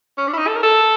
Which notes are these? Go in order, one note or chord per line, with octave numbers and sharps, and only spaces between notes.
C#4
D4
E4
D#4
A4
A#4
A4